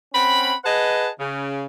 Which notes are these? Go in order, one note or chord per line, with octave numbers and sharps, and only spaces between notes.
C4 C#4 F#5 B5
G#4 B4 D#5 F#5 A5
C#3